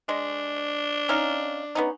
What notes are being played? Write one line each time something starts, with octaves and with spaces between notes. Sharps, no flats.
G#3 D4
C#4 D#4 F5
B3 C#4 D#4